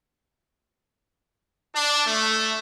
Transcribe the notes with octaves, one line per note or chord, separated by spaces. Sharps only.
D4
A3